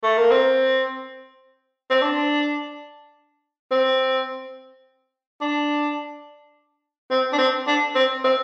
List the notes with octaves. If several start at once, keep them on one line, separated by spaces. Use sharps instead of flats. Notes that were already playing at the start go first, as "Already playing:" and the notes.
A3
A#3
C4
C4
D4
C4
D4
C4
D4
C4
D4
C4
C4